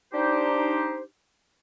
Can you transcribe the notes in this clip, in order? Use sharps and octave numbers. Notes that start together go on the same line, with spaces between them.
D4 D#4 G4 C5